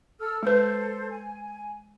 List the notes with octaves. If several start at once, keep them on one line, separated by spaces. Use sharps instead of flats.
A4 E6 F6
G#3 A4 B4 C5
G#5